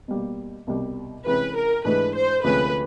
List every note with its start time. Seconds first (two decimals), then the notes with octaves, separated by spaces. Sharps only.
0.08 B2 G3 A#3
0.67 C2 B2 G3
1.26 C3 E3 G#3 C#4 B4
1.55 A#4
1.85 G#2 E3 A3 D4 B4
2.15 C5
2.44 D2 C3 F3 G#3 C#4 B4